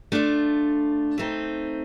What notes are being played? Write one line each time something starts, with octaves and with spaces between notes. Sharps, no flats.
A3 D4 F4
A3 C4 D#4